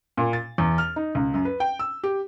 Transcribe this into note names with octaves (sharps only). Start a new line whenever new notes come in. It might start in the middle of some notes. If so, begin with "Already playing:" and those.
A#2
A6
E2
F6
D#4
C#2
F#2
B4
G5
E6
G4